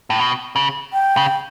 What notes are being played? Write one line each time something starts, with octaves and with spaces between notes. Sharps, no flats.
A2
B2
C#3
G5
C#3